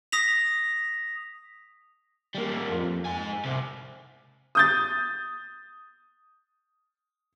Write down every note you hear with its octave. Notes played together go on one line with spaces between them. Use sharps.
D#6 A#6 B6 F7
G3 A#3
F2
G#2 G#5
C2 C3
D#6 G6 A6